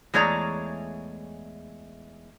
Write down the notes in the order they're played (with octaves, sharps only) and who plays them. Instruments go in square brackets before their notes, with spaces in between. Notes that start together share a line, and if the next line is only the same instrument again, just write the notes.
[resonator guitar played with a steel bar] E2 G#3 A3 C#5 D5 A#5